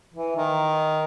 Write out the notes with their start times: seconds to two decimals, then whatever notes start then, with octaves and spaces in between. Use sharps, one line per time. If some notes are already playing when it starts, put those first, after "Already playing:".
0.14 E3
0.36 D#3